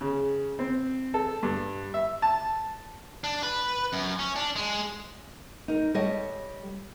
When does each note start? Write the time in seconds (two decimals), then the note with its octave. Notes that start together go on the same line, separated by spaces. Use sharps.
0.01 C#3
0.59 C4
1.14 A4
1.43 G2
1.94 E5
2.22 A5
3.24 D4
3.43 B4
3.93 F#2
4.19 C#4
4.36 D4
4.56 G#3
5.68 D#4 A#4
5.94 G3 A4 C#5 D#5